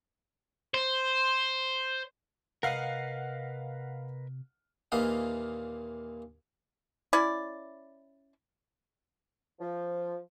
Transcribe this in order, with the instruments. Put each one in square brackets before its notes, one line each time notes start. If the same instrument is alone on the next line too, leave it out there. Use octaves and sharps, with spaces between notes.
[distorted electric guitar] C5
[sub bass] C3 [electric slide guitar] A#4 B4 D#5 [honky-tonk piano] F5 F#5
[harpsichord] D#2 A#2 E3 A#3 D#5 F5
[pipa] C#4 E4 D5
[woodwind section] F3